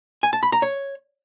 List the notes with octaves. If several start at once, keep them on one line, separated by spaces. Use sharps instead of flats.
G#5
A5
B5
A#5
C#5